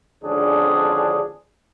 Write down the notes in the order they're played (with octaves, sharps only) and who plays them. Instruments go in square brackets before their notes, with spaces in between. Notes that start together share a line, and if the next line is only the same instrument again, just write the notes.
[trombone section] G#1 F2 D3 C#4 D4 G#4